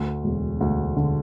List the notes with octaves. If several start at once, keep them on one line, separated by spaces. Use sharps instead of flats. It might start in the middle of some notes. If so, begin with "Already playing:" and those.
Already playing: D2
E1
D2
D3